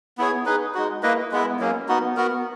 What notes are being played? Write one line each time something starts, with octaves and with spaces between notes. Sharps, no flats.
B3 E4 G#4 C#5
D#4 G#4 B4
G#3 D#4 F#4
A#3 E4 B4 D#5
G#3 B3 E4
F#3 A#3 C#4
B3 D#4 F#4
B3 F#4 A#4